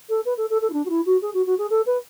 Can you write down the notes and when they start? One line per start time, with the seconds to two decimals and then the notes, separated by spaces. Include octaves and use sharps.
0.09 A4
0.25 B4
0.37 A4
0.50 A4
0.62 A4
0.70 E4
0.73 D4
0.86 F#4
0.90 E4
1.06 F#4
1.22 G#4
1.34 F#4
1.46 F#4
1.58 G#4
1.70 A4
1.86 B4